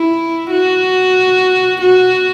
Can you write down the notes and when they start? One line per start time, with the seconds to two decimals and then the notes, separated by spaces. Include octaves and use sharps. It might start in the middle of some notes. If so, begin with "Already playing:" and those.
Already playing: E4
0.51 F#4
1.82 F#4